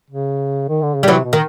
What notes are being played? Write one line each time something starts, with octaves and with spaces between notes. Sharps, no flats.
C#3
D#3
D3
C#3
G3
C3 E3 F#3
B2
D#3